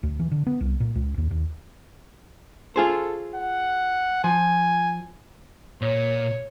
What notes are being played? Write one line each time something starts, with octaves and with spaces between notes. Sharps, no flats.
D2
E3
D3
B3
C2
A#2
C#2
D#2
D#2
F4 G#4 A4 C5
F#5
F3 G#5
A#2 C#5